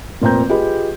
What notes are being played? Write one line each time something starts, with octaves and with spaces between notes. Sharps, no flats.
F1 A#2 C4 A#5 G6
F4 G4 G#4 B4 D#5 B5